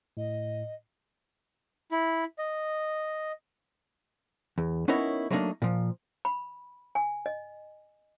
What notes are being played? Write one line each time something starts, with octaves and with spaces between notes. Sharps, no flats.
A2 D#5
E4
D#5
E2
B3 C#4 D#4 E4 A#4 C#5
F#3 G3 A3 A#3 D4 D#4
A#2 F3
B5
G#5
D#5